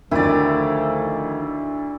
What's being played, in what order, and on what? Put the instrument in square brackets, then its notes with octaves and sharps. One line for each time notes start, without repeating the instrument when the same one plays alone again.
[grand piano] D2 [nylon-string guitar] D#3 [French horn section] F3 A3 [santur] E4 D5